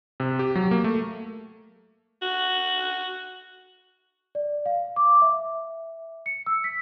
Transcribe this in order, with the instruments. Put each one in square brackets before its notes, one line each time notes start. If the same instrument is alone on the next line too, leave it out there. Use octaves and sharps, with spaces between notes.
[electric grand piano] C3
G4
F#3
A#3
A3
[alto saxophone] F#4
[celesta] D5
F5
D6
E5
C#7
E6
B6